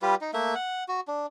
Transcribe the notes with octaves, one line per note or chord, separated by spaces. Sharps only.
G3 F4 G4 B4
D#4
A3 A#3 E5
F#5
F#4
D4